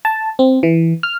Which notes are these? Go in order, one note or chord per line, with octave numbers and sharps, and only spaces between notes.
A5
C4
E3
F6